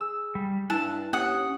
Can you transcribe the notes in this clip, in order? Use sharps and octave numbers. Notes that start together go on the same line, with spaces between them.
G#4 E6
G3
G2 E4 A5 F#6
D#2 C#4 F#5 D#6